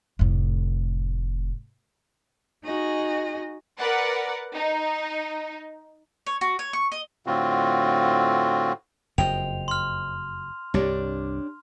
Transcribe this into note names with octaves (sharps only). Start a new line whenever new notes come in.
F1 A2
D#4 F#4 G#4 D#5
A#4 B4 D5 F#5
D#4
C#5
F#4
C#5
C#6
D#5
A2 D3 C4 F4 F#4
F#1 F2 C5 D#5 G5 F7
C6 F6
C2 G2 D4 G4 C#5